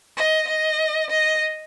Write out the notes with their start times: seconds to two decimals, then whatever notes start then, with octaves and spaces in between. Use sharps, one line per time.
0.17 D#5
0.48 D#5
1.10 D#5